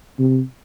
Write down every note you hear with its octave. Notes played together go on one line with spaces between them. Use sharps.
C3